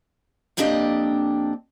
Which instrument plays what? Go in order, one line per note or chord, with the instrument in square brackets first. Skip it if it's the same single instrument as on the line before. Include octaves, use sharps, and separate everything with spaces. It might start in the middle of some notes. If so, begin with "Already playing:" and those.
[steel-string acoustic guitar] F2 A#3 C4 D4 G4 D#5